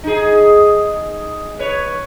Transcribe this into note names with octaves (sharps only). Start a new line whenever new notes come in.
D#4 G#4
B4 C#5